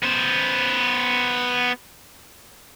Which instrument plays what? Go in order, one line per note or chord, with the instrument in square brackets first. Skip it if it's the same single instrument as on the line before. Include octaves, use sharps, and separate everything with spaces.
[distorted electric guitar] B3 C5